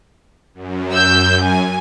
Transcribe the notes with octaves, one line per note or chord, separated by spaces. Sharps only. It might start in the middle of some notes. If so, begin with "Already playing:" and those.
F#2
E6 G6
G#5